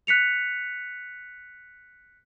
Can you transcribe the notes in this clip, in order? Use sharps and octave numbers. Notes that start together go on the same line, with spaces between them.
F#6 B6 C#7 F7